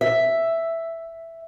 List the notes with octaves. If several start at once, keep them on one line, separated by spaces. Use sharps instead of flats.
E5